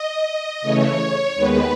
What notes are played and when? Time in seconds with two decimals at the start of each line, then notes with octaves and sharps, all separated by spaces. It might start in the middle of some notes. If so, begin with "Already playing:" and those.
Already playing: D#5
0.61 C#3 E3 A3 C#5
1.35 D#2 D#3 G#3 B3 B4